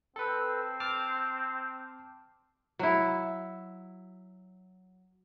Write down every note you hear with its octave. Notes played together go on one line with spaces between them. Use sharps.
C4 A4 B4
A5 D6 F6
F#3 E4